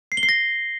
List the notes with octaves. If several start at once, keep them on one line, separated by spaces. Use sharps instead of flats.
C7
G7
C7
A#6